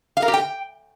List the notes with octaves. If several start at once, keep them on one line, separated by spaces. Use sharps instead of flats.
F5
A#4
G4
G5